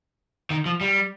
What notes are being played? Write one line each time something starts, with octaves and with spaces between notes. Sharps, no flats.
D#3
F3
G3